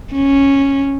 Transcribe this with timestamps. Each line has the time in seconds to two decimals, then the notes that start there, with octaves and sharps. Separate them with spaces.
0.13 C#4